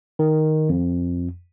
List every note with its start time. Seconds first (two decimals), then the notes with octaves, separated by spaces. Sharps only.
0.19 D#3
0.69 F2